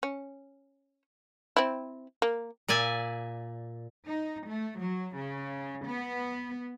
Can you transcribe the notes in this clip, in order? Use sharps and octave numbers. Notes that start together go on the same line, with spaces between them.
C#4
C4 E4
A#3
A#2 D5 E5 G#5
D#4
A3
F#3
C#3
B3